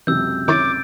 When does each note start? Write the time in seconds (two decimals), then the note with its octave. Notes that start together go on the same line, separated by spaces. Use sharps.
0.07 C#2 F#2 C3 E3 E6 G6
0.48 D#3 E4 C#5 D6 G6 A6 D7